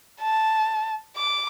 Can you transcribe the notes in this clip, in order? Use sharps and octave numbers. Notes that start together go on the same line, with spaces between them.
A5
D6